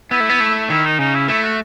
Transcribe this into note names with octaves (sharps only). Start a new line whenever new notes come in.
B3 E4
A3
B3
A3
D#3 E4
D#4
C#3 D#4
E4
A3 E4
F#4